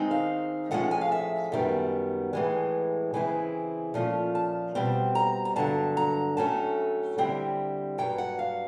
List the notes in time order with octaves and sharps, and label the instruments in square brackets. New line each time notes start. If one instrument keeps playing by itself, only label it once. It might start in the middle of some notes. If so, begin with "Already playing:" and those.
Already playing: [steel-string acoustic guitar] D#3 G#3 C4 D#4
F5
A2 F3 G#3 C#4 F#5
G#5
F5
E5
F#2 D#3 G3 B3
A2 E3 G#3
C#3 E3 G#3 C4 E4 G#5
A#2 F3 A3 C#4
A5
B2 G3 C4
A#5
A#5
G2 D3 F#3 A5
A#5
A2 F#3 A3 C#4 A5
D3 G3 C4 E4
G2 D#3 F#3 G5
F#5
F5